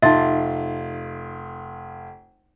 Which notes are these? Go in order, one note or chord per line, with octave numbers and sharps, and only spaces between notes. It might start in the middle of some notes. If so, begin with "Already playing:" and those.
F1 D#4 F4 E5 C6